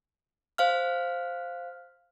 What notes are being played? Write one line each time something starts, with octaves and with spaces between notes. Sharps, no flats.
C5 F5 F6